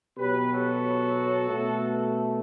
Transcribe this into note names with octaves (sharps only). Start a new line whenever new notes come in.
B2 F#3 B3 G4 B4
F#4 A4
B2 A3